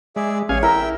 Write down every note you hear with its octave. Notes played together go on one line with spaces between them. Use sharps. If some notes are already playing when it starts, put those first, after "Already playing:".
G#3 G#4 D5 E5
A1 G#4 C#5 F5 G#5
E4 A#4 E5 G5